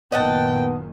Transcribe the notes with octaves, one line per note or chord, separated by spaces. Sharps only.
F#1 A#2 D#3 B3 D#5 F#5 G5 A5